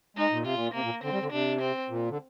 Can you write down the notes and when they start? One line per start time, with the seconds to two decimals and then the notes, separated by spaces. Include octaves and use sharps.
0.17 G#3 D#4
0.32 A#2
0.43 C3 F4
0.55 A#2
0.74 C3 A#3
0.84 A#2
1.04 D3 C4
1.12 G3
1.22 D3
1.32 C3 D4
1.61 C4
1.89 A#2
2.10 D3